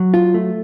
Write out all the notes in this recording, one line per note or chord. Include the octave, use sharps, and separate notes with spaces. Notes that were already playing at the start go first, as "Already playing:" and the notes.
Already playing: F#3
F4
A3